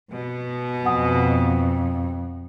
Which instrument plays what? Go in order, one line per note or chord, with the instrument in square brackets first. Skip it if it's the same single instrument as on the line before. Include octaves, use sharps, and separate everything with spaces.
[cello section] B2
[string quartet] F2 [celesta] F#5 G#5 D#6